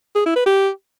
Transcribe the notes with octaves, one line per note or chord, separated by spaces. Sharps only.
G#4
E4
B4
G4